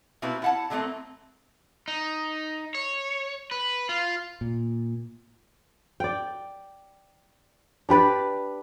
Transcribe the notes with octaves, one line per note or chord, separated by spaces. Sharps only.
B2 A#3 C4 E4 G4 B4
E4 F#5 A5
D3 F#3 A3 A#3 C4
D#4
C#5
B4
F4
A#2
D5 G5
D4 G4 B4 D5